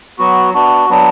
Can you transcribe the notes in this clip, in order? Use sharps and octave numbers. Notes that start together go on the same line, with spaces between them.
F#3 B3 F#4
B3 D4 F#4
F#3 B3 D4